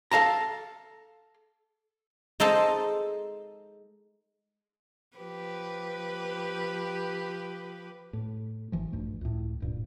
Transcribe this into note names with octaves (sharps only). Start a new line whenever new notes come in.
A4 F5 A5 A#5
G#3 D#4 A4 C5 D#5 A5
F3 G4 B4
A2
G#1 E3 F3
A#1 G2 A3
C#2 A2
D1 G2 A#2